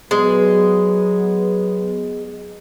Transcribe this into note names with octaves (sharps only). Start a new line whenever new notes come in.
F#3 G#3 B3